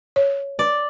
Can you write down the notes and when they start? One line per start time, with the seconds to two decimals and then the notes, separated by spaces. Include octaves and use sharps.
0.16 C#5
0.59 D5